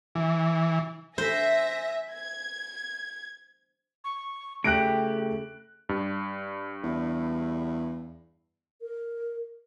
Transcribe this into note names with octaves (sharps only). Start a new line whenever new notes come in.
E3
C5 E5 G#5 A#6
G#6
C#6
C#3 A3 G4 F#6 A#6 D7
G2
E2
A#4